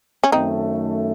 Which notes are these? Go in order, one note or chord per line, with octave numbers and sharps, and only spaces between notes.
C#4
F#2 D#3 A3 C4 D#4